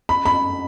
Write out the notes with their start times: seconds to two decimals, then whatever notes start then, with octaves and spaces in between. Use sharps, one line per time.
0.09 B5
0.26 B5